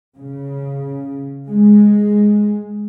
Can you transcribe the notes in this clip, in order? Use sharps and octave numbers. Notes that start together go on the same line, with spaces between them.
C#3
G#3